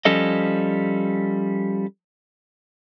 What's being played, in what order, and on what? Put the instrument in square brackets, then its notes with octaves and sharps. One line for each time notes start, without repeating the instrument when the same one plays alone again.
[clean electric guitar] F3 G3 C#4 A4 D#5